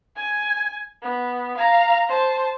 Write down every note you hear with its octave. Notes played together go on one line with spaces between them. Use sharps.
G#5
B3
F5 A#5
C5 A5